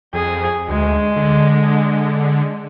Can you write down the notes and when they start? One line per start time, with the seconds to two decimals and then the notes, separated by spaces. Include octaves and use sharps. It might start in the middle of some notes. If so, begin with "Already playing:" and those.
0.14 F2 G#4
0.69 D2 G#3
1.16 D3